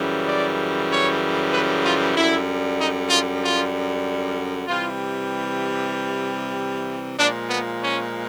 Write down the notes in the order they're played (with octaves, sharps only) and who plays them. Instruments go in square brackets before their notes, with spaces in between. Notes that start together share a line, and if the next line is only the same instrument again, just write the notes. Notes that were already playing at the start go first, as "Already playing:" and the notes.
Already playing: [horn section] F#2 C#3 E3 G3
D5
C#5
B4
F4
F#2 D3 G3 E4
D#4
F4
F4
C3 E3 G3 F4
A#2 F3 G#3 D4
B3
C#4